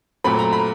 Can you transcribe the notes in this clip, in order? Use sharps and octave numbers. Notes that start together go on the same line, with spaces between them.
A#2 F#3 A3 C4 B5
A#5
B5